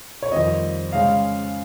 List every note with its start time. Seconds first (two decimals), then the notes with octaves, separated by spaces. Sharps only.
0.23 C#5
0.32 F2 D#3 G3 C4 D#5
0.92 C#3 G#3 C#4 F5